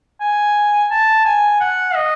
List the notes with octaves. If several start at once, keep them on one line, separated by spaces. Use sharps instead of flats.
G#5
A5
G#5
F#5
D#5